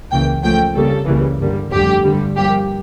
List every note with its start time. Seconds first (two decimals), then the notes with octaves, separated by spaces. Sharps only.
0.11 C#2 C#3 E3 A#3 G5
0.43 C#2 C#3 F3 A3 G5
0.75 F2 C#3 G3 A#3 A4
1.07 C#2 C#3 E3 G3 A#3
1.39 G2 D3 G3 A#3
1.72 G1 F2 D3 A3 G4
2.04 G2 D3 G3
2.36 G2 F3 A#3 G4